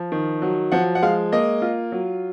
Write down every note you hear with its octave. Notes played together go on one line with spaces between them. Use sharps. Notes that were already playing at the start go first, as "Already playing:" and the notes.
Already playing: F3
D#3
F#3
F3 F#5
F#5
G#3 F5
A#3 D#5
F4
F#3